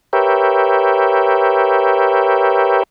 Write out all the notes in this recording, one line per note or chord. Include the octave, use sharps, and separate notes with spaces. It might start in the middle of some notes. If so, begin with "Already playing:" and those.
G4 A#4 B4 C#5 E5 G5